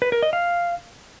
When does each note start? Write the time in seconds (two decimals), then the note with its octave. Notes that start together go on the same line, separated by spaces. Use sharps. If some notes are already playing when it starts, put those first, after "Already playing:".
0.02 B4
0.12 A#4
0.23 D#5
0.33 F5